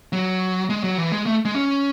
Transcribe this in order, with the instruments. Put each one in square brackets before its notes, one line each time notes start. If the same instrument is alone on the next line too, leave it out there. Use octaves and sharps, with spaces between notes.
[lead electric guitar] F#3
G#3
F#3
E3
G#3
A3
G#3
C#4